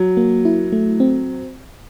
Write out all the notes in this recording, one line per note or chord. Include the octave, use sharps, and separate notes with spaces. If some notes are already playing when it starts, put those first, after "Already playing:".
Already playing: F#3
A#3
E4
A3
C4